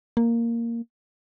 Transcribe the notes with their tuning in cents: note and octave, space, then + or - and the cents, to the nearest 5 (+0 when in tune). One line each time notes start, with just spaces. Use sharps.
A#3 -5